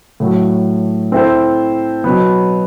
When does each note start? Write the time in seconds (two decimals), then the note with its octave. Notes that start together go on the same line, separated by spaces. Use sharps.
0.20 A2 F#3 A3
1.12 C4 E4 A4 C5
2.04 B2 F#3 B3